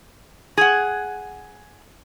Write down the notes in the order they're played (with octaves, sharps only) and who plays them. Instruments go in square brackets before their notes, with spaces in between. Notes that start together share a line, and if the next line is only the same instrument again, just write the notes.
[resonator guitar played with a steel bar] G#4 F#5